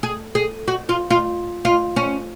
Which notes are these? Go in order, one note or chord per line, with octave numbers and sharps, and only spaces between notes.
G#4
G#4
F#4
F4
F4
F4
C#4